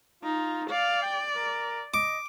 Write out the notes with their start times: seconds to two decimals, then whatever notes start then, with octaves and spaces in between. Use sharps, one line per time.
0.23 D#4 F4
0.70 D5 F5
1.02 G5
1.36 A#4
1.94 D#5 D6